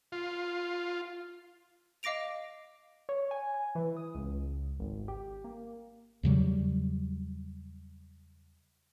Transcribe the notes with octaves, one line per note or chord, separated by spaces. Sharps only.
F4
D#5 F5 D6 A#6 D7 F7
C#5
G#5
G#5
E3
D#6
C#2
G#1
G4
A#3
E2 C#3 F#3 G3